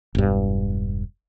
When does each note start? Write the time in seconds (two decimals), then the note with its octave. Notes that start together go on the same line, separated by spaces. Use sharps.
0.15 E1 G2